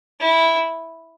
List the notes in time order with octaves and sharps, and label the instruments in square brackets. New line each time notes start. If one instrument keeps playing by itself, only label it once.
[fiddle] E4